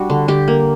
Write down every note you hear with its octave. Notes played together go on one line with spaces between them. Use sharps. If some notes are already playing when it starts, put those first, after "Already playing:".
Already playing: G3 D4 F#4
D3
D3 G4
A#3